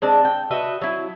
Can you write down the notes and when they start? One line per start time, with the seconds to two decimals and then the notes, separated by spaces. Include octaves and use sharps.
0.02 G#3 C4 D4
0.25 G5
0.51 F#4 B4 D#5 E5
0.81 F#3 E4